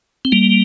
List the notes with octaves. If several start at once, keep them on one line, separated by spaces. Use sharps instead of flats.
C4
G3 A#3